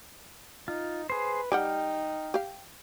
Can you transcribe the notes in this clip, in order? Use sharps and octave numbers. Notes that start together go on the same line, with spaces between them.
D#4 F4
G#4 B4 C5
G3 D#4 G4 F#5 G5 F6
G4 F5